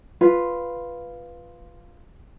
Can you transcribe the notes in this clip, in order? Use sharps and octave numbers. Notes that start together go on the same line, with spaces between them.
F4 B4